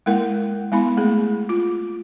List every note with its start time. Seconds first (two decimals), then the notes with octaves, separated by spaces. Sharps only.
0.06 G#3 A#3 E4 A#4 F#5
0.72 G#3 B3 E4 B5
0.97 A3 A#3 G#4
1.49 F4